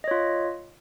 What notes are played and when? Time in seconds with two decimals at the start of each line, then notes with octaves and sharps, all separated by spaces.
0.04 D#5
0.08 C#5
0.11 F4